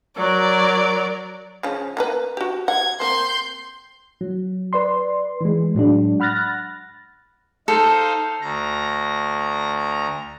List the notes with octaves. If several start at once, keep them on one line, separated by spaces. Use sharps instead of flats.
F#3 A#4 D5
C#3 F3 C#4
A#3 A#4 B4
F#4 G4
F#5 G#6
A#3 C4 C6 G6
F#3
B4 D5 C6
E3 G#3
A2 F#3 G#3 D4
F#5 B5 F6 F#6 A6 A#6
D#4 A4 C5 F5
D2 A#5